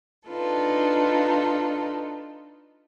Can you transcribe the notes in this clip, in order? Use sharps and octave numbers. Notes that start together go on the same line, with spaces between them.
D4 D#4 F4 A4 B4